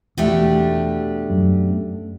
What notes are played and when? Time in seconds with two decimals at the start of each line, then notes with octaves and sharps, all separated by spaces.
0.17 E2 B2 A3 D4 G4
1.30 F#2